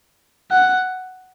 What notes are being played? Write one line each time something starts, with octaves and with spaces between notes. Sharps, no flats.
F#5